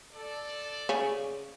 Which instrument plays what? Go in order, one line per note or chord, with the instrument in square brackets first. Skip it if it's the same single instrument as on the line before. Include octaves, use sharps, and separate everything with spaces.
[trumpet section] A4 D5
[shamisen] C#3 C#5 G#5